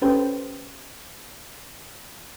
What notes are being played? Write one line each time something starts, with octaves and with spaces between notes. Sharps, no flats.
C#4 G4 A4 B4 C5 G5